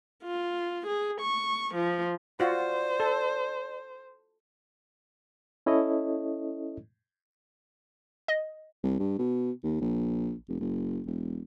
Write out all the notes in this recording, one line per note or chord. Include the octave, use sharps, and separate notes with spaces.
F4
G#4
C#6
F3
F4 F#4 C5 D5
A4
C#4 E4 A4 C#5 D#5
D#5
C2
G2
B2
D#2
A#1
F1
F#1
E1